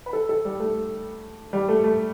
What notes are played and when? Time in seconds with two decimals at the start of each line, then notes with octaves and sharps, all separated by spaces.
0.06 B4
0.13 A4
0.29 A4
0.45 G3
0.60 A3
1.53 G3
1.68 A3
1.84 A3